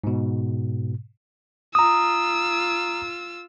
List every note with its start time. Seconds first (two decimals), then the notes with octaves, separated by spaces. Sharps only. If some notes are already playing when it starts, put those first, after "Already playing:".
0.04 G#2 B2
1.75 F4 A#5 D#6 E6